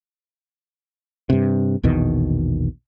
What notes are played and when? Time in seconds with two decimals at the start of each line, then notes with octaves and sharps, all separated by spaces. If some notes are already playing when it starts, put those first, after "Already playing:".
1.30 G2 C3
1.83 A#1 E2 B2 D#3